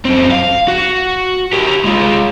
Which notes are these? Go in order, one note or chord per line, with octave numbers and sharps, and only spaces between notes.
F#2 C4
F5
F#4
G4 A#4
G#3 F4